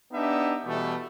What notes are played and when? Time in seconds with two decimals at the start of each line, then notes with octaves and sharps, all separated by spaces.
0.12 B3 D4 D#4 G4 E5
0.66 B2 E3 G3 A3